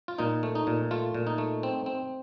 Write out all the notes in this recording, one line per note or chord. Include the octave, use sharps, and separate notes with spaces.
F4
A#2 D#4
A3
D#4
A#2
A3 F4
A#2
D#4
A3
C4
C4